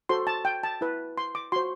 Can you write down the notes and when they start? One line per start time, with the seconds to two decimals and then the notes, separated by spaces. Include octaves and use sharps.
0.09 F#4 A4 C5 C6
0.27 A5
0.45 G5
0.63 A5
0.81 E4 B4
1.18 C6
1.35 D6
1.52 F#4 C5 C6